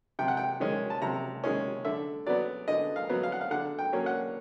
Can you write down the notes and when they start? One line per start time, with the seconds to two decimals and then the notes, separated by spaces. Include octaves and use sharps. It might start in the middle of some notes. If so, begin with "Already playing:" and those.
0.19 C3 G5
0.28 F#5
0.37 G5
0.60 D#3 G#3 C#4
0.90 A5
1.02 C3 A#5
1.44 D#3 G#3 C#4
1.85 D3 E5
2.26 F#3 B3 D5
2.68 D3 D#5
2.96 F5
3.10 F#3 B3
3.23 F5
3.32 F#5
3.41 F5
3.51 D3 F#5
3.79 G5
3.92 F#3 A#3 C#4
4.06 F#5